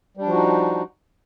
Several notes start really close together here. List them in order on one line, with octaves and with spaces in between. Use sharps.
G3 D4 F3 F#4 D#4